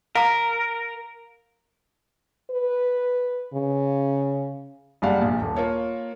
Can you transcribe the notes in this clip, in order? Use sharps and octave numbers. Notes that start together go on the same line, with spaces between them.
A#4 F5 A#5
B4
C#3
F#1 G3 D5 F5 F#5
A#1 A#2
D#1
A#3 F4 C#5